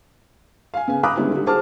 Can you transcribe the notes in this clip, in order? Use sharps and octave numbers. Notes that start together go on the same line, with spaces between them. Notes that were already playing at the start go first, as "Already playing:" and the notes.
F5 G#5
C#3 B3 G#5
A#5 B5 D6 D#6 F#6
D3 G3 G#3 B3 C#4 E4
D3 G3
F#4 G#4 C5 A5 D6 F6